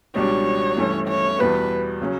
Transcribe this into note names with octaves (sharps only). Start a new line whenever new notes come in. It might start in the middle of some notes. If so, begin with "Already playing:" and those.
C#2 B2 G3 D4 G4 C#5
G2 E3 A3 C#4
C#5
E2 B2 G3 B3 B4
C#3 F#3 C#4